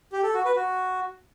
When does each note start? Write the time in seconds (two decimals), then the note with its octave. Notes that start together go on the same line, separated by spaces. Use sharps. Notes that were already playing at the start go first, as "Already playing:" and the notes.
0.12 G4
0.23 A4
0.34 F#4
0.45 B4
0.56 F#4